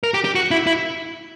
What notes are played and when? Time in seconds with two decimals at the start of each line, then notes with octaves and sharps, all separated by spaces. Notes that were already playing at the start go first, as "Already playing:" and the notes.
0.03 A#4
0.14 G4
0.25 G4
0.35 F#4
0.51 E4
0.67 E4